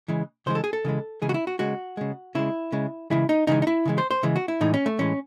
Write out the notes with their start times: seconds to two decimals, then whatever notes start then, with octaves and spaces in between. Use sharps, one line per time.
0.08 C#3 E3 G#3
0.46 C#3 E3 G#3 C5
0.55 A4
0.64 G#4
0.73 A4
0.85 C#3 E3 G#3
1.22 C#3 E3 G#3 G#4
1.29 F#4
1.34 E4
1.47 F#4
1.59 C#3 G#3 F#4
1.97 C#3 G#3
2.35 C#3 G#3 E4
2.72 C#3 G#3
3.10 C#3 E3 G#3 E4
3.29 D#4
3.47 C#3 E3 G#3 D#4
3.62 D#4
3.67 E4
3.85 C#3 E3 G#3
3.98 C5
4.11 C5
4.23 C#3 E3 G#3
4.36 F#4
4.48 E4
4.61 A2 E3 G#3 D#4
4.74 C#4
4.86 A3
4.99 A2 E3 G#3 C#4